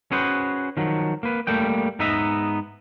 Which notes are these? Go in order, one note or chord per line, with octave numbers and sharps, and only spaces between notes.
C#4 F#4 G#4 B4 C5
D#3 F3 F#3
A#3 B4
G3 A3 A#3 G5
G#2 B3 D#4 D#5 E5 A#5